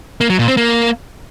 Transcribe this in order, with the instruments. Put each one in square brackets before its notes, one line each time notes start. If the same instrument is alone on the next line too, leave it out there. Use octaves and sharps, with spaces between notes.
[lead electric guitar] A#3
F#3
A#2
C4
A#3